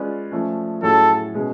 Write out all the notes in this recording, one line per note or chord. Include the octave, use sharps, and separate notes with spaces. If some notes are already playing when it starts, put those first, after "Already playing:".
Already playing: G#3 C#4 F4 B4 D5
F3 A3 C#4
A2 F#3 C#4 G#4 A4 C#5
B2 G#3 C#4